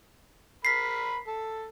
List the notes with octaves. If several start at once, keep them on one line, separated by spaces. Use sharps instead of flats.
A#4 B5 B6 C7
A4